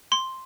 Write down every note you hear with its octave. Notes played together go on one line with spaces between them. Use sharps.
C6